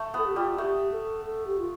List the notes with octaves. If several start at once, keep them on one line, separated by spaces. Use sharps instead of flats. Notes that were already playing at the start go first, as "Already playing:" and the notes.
Already playing: A3
B3 A4
G4
G3 F4
A3 G4
A4
A4
G4
F4